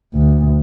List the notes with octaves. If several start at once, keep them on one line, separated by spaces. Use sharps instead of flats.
D2